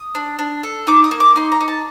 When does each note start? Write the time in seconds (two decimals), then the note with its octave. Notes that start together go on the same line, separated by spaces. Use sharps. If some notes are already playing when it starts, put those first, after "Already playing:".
Already playing: D#6
0.15 D4
0.39 D4
0.63 A4
0.87 D#4 D6
1.04 D#6
1.11 A#3
1.20 D6
1.36 D#4 C6
1.52 A#5
1.61 D#4
1.68 A5